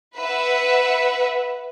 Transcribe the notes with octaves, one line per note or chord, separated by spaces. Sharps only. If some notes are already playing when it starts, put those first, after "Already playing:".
B4 E5 F#5